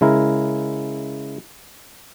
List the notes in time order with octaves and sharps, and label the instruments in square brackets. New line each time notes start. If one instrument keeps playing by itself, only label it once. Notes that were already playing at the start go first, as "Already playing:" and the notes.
[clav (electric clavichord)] C#3 G#3 E4 A#4